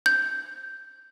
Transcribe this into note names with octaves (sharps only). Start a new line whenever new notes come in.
G6